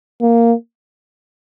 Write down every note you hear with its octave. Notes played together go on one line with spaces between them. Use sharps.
A#3